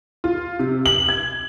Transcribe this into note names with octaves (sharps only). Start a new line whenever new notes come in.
F4
C3
F#7
G#6